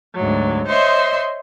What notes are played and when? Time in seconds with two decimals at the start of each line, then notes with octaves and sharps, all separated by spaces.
0.14 D2 G#2 F#3
0.67 C5 C#5 D#5 E5 C6